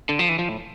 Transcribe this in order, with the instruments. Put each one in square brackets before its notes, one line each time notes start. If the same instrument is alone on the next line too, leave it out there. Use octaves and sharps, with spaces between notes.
[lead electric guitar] D3
F3
E3
F3
A2